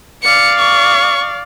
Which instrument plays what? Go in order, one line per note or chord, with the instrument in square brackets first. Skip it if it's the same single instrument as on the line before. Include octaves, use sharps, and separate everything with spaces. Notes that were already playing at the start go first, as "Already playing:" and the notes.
[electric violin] D5 F5 [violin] C#7
[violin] C#6